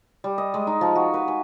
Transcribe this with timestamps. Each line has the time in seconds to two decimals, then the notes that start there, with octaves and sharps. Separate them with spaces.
0.24 G3
0.38 D#5
0.54 G#3
0.67 D#4
0.81 F3
0.95 F#4
1.14 B4
1.28 G#5